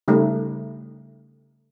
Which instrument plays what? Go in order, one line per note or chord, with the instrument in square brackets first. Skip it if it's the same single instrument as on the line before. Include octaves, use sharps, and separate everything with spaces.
[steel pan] C#3 G3 A3 D#4